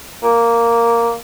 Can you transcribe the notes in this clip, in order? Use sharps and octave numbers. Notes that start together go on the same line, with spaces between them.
A#3